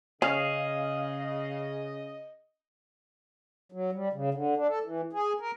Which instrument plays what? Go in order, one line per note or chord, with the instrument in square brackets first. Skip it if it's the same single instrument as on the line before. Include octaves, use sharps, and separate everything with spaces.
[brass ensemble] C#3 [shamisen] C#4 [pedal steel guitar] G#4 F5 [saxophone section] D#5
[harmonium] F#3
G3
C#3
D3
D4
A4
E3
G#4
A#4